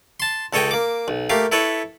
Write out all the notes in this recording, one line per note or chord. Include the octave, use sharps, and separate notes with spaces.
A5 C6
C#2 A4 C#5 D#5 G5
A#3 D6
B1
A3 A#3 G4 F5
E4 A4 B4 C#5